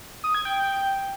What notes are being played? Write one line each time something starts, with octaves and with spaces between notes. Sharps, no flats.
D#6
G#6
G5